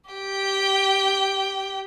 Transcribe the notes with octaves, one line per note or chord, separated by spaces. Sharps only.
G4 G5